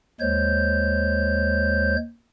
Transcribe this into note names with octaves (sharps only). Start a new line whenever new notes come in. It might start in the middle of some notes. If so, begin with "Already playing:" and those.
D#2 G#3 C5 C#5 G6